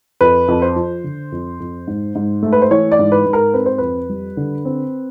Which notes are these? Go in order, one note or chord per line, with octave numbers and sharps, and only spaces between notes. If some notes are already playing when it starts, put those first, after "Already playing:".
F2 B4
F2
C5
F3
D3
F2
F2
G#2
G#2
A3
B4
C5
E3 C#5
D5
G#2
B4
G#2
A#4
C4 B4
C5
F2 B4
G3
D3
C4